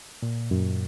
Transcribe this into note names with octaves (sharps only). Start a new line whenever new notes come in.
A#2
F#2